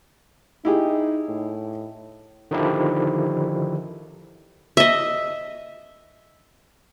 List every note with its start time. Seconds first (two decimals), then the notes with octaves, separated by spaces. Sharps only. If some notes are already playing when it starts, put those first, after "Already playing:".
0.65 D#4 E4 G4 G#4
1.28 A2
2.51 D3 D#3 F3 D#4 E4 G4
4.77 D#5 E5